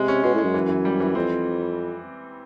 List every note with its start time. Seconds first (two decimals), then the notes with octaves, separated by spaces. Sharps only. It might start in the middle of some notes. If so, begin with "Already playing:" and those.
Already playing: C3 G#3
0.08 C#4
0.24 B2 G#3
0.34 A2 G#3
0.44 F#2
0.54 E3
0.69 E3
0.85 G3
1.00 E3
1.15 F2 C4